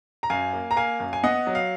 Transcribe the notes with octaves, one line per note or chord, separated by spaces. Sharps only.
A#5
F#2 F5 G#5
A#3
A#5
A#3 F5 G#5
F#2
G#5
B3 D#5 F#5
F#3
F5